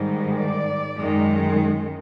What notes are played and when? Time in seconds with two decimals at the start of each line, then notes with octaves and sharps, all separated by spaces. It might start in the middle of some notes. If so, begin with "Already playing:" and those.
Already playing: G#2 D#3 G3
0.40 D5
0.98 F#2 D#3 G#3